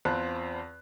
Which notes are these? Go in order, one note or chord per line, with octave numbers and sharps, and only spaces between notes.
E2 C4 F4 A5 B5 F#6